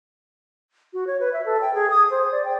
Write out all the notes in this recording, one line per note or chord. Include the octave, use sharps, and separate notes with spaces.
F#4
C#5
B4
E5
A4
G5
G#4
D#6
C5
D5
G5